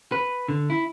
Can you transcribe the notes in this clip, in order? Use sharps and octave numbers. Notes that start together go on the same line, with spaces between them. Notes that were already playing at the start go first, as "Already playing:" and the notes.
B4
D3
E4